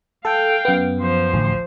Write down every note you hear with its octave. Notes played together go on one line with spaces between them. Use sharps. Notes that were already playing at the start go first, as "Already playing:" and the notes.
A4 F5 G5
F#2 B3
F3 C5
A1 D2